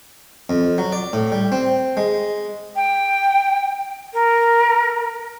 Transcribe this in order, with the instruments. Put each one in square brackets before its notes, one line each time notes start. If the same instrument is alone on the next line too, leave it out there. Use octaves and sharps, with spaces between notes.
[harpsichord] F2
F#3
D5
A2
G3
C4
G#3
[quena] G5
A#4